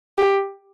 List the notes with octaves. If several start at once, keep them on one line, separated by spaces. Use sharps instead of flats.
G4